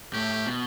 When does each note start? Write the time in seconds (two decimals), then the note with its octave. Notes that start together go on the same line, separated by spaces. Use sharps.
0.13 A2 G4
0.46 B2